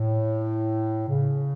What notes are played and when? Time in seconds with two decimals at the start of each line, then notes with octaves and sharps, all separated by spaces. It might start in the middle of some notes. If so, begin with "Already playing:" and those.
Already playing: A2
1.07 C#3